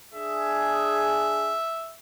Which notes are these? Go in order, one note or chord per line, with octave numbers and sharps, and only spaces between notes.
D4 G#4 E5